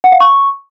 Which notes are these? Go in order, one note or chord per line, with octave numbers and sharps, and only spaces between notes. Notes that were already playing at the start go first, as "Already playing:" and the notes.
F#5
F5
C#6